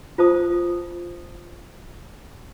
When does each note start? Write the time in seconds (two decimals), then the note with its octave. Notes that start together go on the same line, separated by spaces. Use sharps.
0.18 F4 C5 A5 D#6